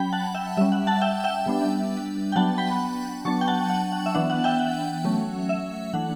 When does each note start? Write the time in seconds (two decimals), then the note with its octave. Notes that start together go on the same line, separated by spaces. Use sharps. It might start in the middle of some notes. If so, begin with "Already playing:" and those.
Already playing: F#3 C#4 G5 B5
0.13 F#5 A5
0.35 E5 G5
0.57 G3 C#4 E5
0.72 F#5
0.87 F#5 A5
1.01 E5 G5
1.24 E5 G5
1.46 G3 B3 D4
2.32 G5
2.36 F#3 B3 D4 F#5 A5
2.58 G5 B5
3.25 F#3 B3 D4 A5 C#6
3.41 G5
3.48 F#5 A5
3.70 F#5
3.92 F#5
4.06 E5
4.14 E3 B3 D4 F#5
4.30 F#5
4.44 E5 G5
4.59 F#5
5.04 F#3 A3 C#4
5.49 E5
5.93 E3 A3 D4 F#5